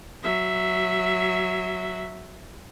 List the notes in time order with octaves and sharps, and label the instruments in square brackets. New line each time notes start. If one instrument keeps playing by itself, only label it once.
[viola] F#3 E5